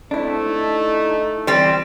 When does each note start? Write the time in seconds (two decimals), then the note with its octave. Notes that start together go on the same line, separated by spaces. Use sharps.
0.11 G#3 A3 C4 D4 E4
0.48 D#4
1.47 E3 G3 C4 G4 C5 D5